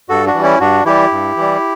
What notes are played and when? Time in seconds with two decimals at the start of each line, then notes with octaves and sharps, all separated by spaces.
0.09 G2 F#4 A4
0.26 D4 F#4
0.35 E3 G3
0.43 C#4 E4
0.60 G2 D4 F#4
0.85 E3 G3 E4 G4
1.11 G2
1.36 E3 G3